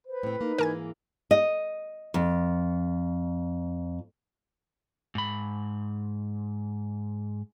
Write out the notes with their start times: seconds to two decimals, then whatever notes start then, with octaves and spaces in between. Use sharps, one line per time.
0.07 B4 C5
0.23 A2 C4
0.41 A#3 D#4
0.58 G#2 E3 A#3 A#4 G#5 G#6
1.31 D#5
2.14 F2
5.15 G#2 B5